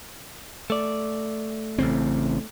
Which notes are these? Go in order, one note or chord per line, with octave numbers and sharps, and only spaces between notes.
A3 D5
A1 C#3 C4